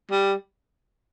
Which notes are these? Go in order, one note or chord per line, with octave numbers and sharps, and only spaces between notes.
G3